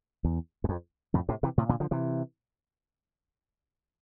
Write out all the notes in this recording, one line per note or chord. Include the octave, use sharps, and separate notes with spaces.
E2
E2
F2
F2 A2
A2 C3
C3 E3
A2 C3
A#2 D3
D3 F3
C3 E3